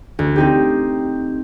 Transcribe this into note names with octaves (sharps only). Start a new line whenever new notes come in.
D2
C4 D#4 G4